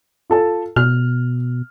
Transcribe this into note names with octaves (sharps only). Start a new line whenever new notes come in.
F4 A4 A5
B2 F6